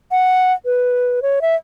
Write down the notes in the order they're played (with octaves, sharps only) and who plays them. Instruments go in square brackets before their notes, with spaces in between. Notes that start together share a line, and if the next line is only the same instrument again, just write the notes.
[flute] F#5
B4
C#5
E5